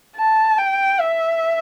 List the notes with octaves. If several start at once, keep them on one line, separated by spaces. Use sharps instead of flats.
A5
G5
E5